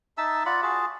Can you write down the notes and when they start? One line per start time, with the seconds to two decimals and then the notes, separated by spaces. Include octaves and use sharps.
0.18 D#4 E5 A5 E6
0.46 F4 D5 F#5 B5
0.63 F4 F#4 G#4 A5